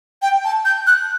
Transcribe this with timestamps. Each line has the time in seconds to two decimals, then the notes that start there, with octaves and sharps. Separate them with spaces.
0.22 G5
0.44 A5
0.65 G6
0.87 F#6